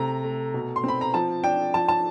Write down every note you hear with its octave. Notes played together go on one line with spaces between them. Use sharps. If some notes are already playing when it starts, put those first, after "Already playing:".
Already playing: C3 A3 A#5
A3
B2
C6
C4 B5
A#5
F3 A5
D4 G5
F3 A5
A5